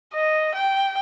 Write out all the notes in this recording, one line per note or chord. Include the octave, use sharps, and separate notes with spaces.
D#5
G5